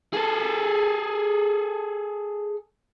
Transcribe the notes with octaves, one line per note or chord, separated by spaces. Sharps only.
G#4 A4